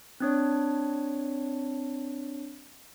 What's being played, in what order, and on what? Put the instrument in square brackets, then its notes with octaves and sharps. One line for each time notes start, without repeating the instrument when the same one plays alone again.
[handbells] C4 D4 C#5